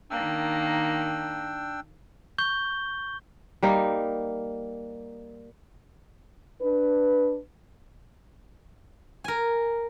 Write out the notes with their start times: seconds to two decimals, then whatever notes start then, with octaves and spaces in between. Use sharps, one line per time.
0.11 D#3 A#3 D4 G5 E6
2.38 C#6 G6 G7
3.62 G3 A#3 D#4
6.61 D4 B4
9.24 A#4 G#5